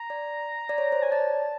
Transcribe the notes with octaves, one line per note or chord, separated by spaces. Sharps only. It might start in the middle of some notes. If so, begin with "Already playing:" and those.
Already playing: A#5
D5
D5
C#5
C5
C#5 G#5
D5 A5